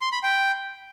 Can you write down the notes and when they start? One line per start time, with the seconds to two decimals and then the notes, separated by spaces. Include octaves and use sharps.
0.01 C6
0.12 B5
0.23 G5